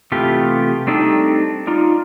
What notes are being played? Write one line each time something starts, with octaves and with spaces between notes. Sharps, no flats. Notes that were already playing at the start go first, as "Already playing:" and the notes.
C3 E3 A3 B3 F4 G4
G3 A3 C4 D4 D#4 A4
D#4 F4 D5